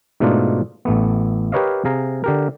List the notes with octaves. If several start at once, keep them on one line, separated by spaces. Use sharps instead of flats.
G#2 B2 A3 D4 D#4 F4
A1 A3 B3
G4 A#4 B4 C#5 D#5 F5
C3 G#4 F5 A#5
D3 G4 A#4